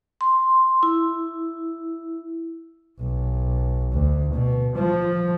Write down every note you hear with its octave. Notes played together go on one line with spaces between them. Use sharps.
C6
E4
B1
D2
B2
F3